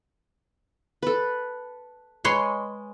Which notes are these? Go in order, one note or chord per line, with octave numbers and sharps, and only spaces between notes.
A4 B4
G#3 B4 C#5 C6